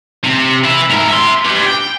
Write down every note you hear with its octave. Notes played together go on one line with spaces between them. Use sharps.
C3
B4 E5
G#2 A#4
E5 C6
G4 B4
G5